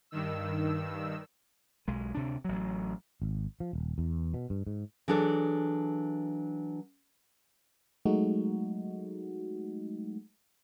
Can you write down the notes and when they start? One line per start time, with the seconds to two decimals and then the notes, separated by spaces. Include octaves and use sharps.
0.11 G2 D#3 E6
1.88 B1 G#3
2.15 D2 C3 D4
2.45 A1 F#3
3.22 G#1
3.60 F3
3.73 D#1
3.98 E2
4.34 B2
4.50 G2
4.67 G#2
5.08 E3 F#3 D4 G#4 A4
8.05 F#3 G#3 A3 D#4 F#4